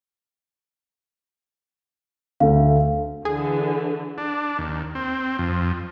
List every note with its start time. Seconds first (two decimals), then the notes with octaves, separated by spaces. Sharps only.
2.40 D2 A3 F5
3.25 D3 E3 G#4
4.18 D4
4.58 D#2
4.95 C4
5.39 F2